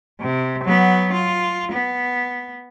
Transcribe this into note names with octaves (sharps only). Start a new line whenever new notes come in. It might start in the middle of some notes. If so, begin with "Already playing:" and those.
C3
F#3 B3
F4
B3